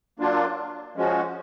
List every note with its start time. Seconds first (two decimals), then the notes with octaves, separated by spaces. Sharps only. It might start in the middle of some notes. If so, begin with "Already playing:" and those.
0.19 F#3 A#3 D4 F4
0.96 F3 G#3 C#4 F#4